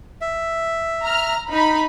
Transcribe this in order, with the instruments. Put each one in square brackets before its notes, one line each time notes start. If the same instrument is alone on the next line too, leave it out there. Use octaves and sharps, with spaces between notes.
[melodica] E5
[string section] A#5 F6
D#4 B5